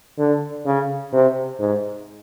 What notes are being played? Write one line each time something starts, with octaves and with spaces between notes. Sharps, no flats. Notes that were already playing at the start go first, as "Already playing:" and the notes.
D3
C#3
C3
G#2